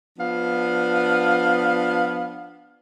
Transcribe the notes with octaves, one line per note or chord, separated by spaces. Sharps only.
F3 B3 D4 F5